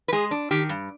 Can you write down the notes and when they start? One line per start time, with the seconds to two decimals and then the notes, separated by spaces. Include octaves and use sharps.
0.08 B4
0.12 G#3 G#4
0.31 D4
0.51 D#3 G4
0.69 G2